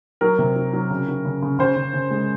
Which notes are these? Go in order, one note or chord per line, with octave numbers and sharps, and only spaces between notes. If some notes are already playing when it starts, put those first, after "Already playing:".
F#3 A#4
C3
F#3
F#3
C#3
F#3
C#3
C#3
C#3 C5
C#3
C#3
G#3